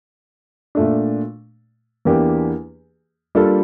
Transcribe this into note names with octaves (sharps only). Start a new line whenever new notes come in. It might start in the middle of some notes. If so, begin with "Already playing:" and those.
A#2 A3 D4
E2 E3 A#3 D4 G4
G3 A#3 D4 F4 A4